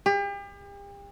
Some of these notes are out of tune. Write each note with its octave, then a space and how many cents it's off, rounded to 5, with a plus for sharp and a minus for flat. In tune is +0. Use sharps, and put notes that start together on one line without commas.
G4 +40